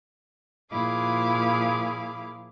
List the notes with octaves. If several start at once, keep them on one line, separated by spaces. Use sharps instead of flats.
A#2 F3 E4 G#4 F5 D6